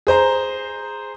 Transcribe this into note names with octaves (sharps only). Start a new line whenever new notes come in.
G#4 C5 A#5